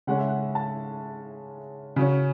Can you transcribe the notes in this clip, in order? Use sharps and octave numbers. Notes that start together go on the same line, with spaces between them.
C#3 G#3 C#4 F#5
E5
F#5
A5
C#3 F#3 C#4